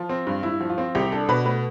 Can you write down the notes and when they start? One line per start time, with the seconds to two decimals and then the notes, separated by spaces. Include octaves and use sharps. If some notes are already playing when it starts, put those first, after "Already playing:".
Already playing: F3 F4
0.09 C4
0.27 G2
0.43 G2 E4
0.60 F3
0.70 F4
0.78 C4
0.95 C2 G4
1.12 D4 A4
1.29 B2 B4
1.46 A3 B4